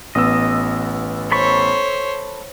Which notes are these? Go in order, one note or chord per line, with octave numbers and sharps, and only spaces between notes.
A1 B3 D#5 E6
A4 C5 C#5 B5 C#6